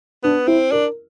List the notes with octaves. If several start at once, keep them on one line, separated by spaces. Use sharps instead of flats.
B3 D4
C4 E4
D4 A#4